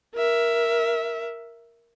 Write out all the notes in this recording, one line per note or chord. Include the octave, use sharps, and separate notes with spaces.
A#4 E5